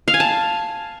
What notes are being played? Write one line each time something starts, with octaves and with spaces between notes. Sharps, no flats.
F5
G#5
A5